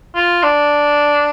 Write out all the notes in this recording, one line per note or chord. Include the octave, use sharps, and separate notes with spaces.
F4
D4